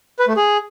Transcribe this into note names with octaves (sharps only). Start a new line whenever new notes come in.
B4
A3
G#4